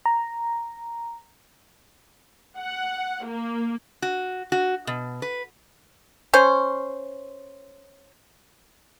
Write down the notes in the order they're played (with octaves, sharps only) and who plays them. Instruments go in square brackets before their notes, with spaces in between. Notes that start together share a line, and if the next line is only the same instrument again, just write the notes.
[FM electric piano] A#5
[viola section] F#5
A#3
[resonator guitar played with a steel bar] F#4
F#4
B2
B4
[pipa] C#4 C5